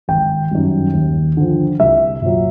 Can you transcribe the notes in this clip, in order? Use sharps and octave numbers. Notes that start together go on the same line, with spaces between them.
G#1 G5
F#2 D#3 G3
D#2
D3 F3
C2 E5
A#2 F#3